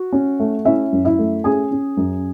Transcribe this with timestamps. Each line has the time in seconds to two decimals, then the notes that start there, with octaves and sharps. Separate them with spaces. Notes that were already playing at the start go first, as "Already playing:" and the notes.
Already playing: F#4
0.12 C#4
0.40 A3
0.65 C#4 E4 E5
0.92 F#2
1.05 E4 E5
1.19 A3
1.44 C#4 G#4 G#5
1.71 C#4
1.97 F#2